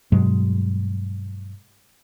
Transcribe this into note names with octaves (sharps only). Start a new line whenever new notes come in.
G2 B2 F#3 G#3